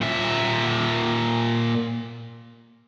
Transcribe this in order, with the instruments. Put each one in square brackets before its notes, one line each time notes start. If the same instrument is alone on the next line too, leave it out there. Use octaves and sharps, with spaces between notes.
[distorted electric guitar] A#2 E5